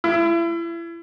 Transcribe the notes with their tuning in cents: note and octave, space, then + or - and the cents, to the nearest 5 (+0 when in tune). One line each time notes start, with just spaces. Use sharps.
E4 +35